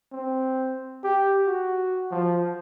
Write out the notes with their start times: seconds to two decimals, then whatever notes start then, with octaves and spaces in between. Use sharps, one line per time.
0.12 C4
1.04 G4
1.47 F#4
2.11 F3